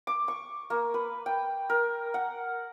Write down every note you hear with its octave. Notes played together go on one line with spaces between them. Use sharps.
D6
C#6
A#3
B4
G5
A#4
F#5